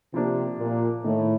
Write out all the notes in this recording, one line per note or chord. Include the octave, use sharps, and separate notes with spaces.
C3 F3 A#3 D4
A#2
A2 D#3 A3 D#4